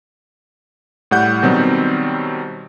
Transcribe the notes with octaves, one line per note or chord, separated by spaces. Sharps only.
A2 G3 F#5 G6
B2 D#3 F#3 G3 C4